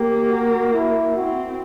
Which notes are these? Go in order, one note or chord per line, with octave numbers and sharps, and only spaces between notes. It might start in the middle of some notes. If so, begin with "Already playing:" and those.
Already playing: A#3 G4
F#4
E4
C4 F#4